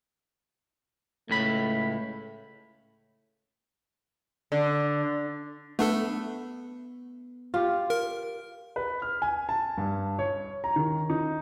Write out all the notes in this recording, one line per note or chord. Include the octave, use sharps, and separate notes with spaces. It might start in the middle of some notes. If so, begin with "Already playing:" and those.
C#2 A2 A3 B5
D3
A3 B3 D4 A4
F4 G4
A#4
B4
F6
G#5
A5
G2
C#5
A#5
D#3
D#4